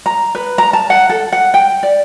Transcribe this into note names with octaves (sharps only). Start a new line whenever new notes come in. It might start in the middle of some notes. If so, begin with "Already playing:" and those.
A#5
B4
A#5
A5
F#5
A4
F#5
G5
D5